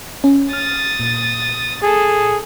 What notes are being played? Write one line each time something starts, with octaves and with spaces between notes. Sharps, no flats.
C#4
D#6 F6 A6
A#2
G#4 A4